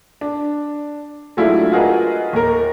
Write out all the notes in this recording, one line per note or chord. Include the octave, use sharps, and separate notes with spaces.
D4
F#3 G#3 A3 D4 E4 F4
F4 F#4 G#4 A#4 B4 D#5
D#2 A#4